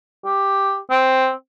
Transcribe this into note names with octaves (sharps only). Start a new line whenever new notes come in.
G4
C4